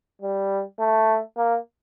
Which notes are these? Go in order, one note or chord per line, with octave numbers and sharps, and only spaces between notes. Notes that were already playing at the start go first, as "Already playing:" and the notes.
G3
A3
A#3